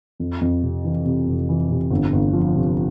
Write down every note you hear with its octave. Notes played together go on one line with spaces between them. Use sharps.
F2
F2
C3
E3
C3
F1
E3
C3
G1
G1
F3
C3